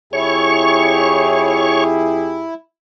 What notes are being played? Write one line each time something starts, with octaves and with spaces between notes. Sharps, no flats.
F2 E4 G4 G#4 C#5 C#6